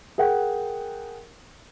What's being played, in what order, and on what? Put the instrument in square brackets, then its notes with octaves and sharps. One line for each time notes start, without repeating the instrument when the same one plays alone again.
[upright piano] G#4 A#4 F#5 G5